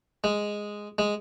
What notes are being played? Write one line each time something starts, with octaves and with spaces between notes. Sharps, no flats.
G#3
G#3